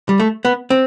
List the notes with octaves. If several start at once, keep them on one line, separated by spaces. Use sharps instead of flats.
G3
A3
B3
C4